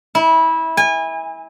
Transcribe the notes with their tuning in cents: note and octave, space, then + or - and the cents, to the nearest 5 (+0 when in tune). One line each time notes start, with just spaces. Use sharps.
E4 -25
G#5 -30